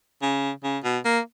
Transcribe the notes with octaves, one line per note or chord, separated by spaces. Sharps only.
C#3
C#3
B2
A#3